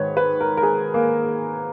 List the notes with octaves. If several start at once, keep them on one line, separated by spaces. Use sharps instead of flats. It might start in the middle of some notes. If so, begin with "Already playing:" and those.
Already playing: G#2 D#3 B4 C#5
B4
A#4
A#4
G#4
A#3